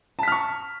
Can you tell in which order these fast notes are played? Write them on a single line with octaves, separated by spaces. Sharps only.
A5 B6 F6 C#6